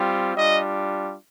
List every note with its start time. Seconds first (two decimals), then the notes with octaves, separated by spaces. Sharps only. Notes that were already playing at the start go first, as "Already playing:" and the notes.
Already playing: G3 C4 F4
0.35 G3 D4 F4 D#5